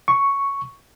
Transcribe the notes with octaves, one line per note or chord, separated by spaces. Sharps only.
C#6